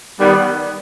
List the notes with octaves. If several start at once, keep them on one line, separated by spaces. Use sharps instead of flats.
D#3 G3 B3